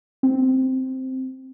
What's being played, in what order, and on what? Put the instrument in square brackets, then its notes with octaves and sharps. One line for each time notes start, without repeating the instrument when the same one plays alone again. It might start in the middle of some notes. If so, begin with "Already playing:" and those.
[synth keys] C4